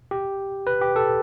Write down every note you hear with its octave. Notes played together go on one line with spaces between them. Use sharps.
G4
B4
G4
A4